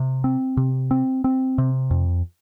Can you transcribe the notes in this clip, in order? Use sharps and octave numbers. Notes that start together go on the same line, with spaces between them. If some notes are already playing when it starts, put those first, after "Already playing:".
Already playing: C3
C4
C3
C4
C4
C3
F2